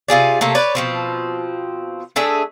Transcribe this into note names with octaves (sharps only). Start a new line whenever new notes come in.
C3 F4 G#4 D5
C3 A3 A#3
B4 C#5 D5
B2 F3 C4
A3 D4 G#4 E5